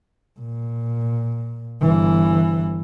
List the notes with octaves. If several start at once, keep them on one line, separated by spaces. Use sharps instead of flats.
A#2
G1 E3